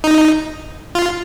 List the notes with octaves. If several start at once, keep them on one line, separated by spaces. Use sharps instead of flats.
D#4
F4